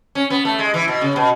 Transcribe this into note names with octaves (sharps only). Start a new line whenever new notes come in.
C#4
B3
A3
G#3
E3
B2
C#3
B2